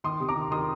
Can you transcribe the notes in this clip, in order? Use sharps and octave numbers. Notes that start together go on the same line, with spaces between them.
D#3 C6 D#6
C3
A#5 D6
D#3
D#3 C6 D#6